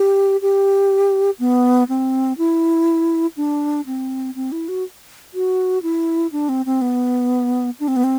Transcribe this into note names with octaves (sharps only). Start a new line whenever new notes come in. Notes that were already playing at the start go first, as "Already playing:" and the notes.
Already playing: G4
G4
B3
C4
E4
D4
C4
C4
E4
F#4
F#4
E4
D4
C4
C4
B3
D4
C4
B3
C4